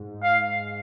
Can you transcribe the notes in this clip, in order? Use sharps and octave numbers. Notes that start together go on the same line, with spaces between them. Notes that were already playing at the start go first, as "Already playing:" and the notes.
Already playing: G#2
F5